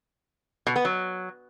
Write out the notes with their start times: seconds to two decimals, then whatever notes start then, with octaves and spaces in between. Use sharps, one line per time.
0.67 B2
0.76 B3
0.85 F#3